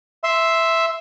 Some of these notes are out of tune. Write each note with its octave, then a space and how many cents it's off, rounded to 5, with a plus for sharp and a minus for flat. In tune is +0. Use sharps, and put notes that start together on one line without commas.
E5 +0 C6 +0